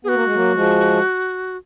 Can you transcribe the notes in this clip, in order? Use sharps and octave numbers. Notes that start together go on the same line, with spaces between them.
B3 F#4 G#4
A#3
G#3
F#3 A#3
F3 G#3